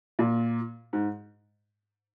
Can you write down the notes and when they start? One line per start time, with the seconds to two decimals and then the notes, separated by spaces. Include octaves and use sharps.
0.19 A#2
0.93 G#2